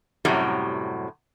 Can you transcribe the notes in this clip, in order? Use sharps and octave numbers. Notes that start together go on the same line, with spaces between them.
F#2 A2 C3 F#3 G3